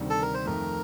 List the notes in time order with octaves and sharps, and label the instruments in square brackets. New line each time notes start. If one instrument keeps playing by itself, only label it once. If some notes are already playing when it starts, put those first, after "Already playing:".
Already playing: [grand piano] D2 C3 D#3 G3
[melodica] A4
A#4
C5
[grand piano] F2 D#3 A3 [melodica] A#4